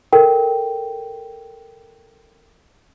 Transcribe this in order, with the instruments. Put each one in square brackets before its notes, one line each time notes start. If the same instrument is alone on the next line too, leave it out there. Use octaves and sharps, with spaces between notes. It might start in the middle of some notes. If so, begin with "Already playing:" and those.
[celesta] A4 A#4 G5